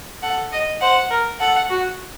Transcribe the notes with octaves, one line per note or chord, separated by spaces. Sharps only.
A4 F#5
D#5
C5 F#5
A#4
A4 F#5
F#4